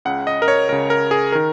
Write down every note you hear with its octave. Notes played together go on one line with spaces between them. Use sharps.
C#2 C#3 F#5
D#5
A#4
C#5
C#2 C#3 A#4
A#4
G#4
D#3 A#4